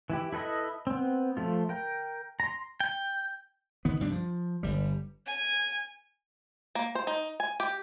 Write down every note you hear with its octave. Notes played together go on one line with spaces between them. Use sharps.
E3 E4 G4
E4 A4 B4 D#5 E5
B3 C4
F3 A3 F4
A#4 G5
A#5 C6
G5
D#3 B3
C2 G2 G3 D4
F3
G1 G3
G#5
A#3
C5
D#4
G#5
G4